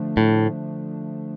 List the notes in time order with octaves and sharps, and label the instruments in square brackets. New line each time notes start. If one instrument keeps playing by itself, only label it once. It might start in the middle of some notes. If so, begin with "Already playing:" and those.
Already playing: [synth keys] D3 F3 A3 D4
[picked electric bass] A2